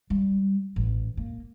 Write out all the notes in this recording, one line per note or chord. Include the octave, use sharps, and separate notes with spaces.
G3
A1
A#3